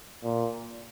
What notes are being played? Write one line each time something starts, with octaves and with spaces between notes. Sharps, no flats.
A#2